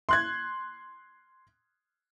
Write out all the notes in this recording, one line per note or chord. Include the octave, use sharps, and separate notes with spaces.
C6 F#6 G#6